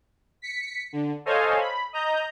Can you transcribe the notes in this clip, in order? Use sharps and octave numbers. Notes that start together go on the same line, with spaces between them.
B6 C#7
D3
A4 C5 C#5 D#5 F5 G#5
B5
D#5 A#5 G6